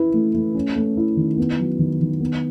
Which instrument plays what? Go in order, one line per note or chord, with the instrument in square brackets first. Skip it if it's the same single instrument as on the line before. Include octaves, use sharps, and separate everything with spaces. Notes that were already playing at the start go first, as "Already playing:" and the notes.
Already playing: [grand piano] E4 B4
A3
A3
C#4
A3
E4
D#3
B3
F#3
D#3
D#3
B3